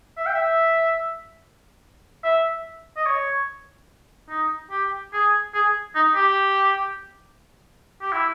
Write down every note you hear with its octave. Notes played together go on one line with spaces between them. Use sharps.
E5
G5
E5
E5
D#5
C#5
D#4
G4
G#4
G#4
D#4
G4
G4
E4